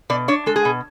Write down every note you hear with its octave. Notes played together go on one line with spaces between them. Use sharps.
B2 D5
D4 C#5
G#3 A4
G#4
B2